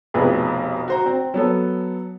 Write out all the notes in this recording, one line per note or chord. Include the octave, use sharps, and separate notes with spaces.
F1 B1 F2 G#4 B4
F#4 C5 A#5
C4
F#3 B3 A4